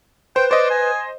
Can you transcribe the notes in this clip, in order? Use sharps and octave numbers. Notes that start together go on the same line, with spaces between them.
B4 C5 G5
C5 D5 D#5
G#5